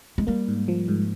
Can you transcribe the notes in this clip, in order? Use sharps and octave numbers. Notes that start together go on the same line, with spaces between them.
G#3
G3 A#3
G#2
F3
G#2